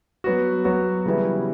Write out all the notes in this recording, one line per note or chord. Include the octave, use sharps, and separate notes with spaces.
F#3 B3 F#4
F#3 B3 F#4
C#3 E3 G3 B3 E4